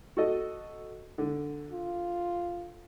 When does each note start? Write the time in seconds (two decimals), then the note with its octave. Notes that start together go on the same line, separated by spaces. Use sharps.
0.17 F#4 A4 D#5
1.18 D3
1.71 F4